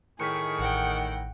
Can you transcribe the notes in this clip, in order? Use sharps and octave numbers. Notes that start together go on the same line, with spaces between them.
A2 D#3 G#4 C#6 B6 C#7
A1 F#5 G5